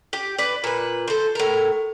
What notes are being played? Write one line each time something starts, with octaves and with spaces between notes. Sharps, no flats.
G4
B4 D5
A#2 B4
A4 C5
A2 A#4